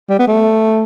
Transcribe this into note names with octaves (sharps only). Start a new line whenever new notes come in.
G3
B3
A3